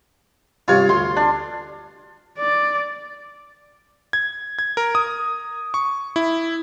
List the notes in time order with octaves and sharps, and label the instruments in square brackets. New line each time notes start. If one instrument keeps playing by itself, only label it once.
[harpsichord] G2 C3 C#4 [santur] F4 C#5
[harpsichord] D2 [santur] C6
[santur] D4
[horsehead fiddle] D5
[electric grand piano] G#6
G#6
A#4
D#6
C#6
E4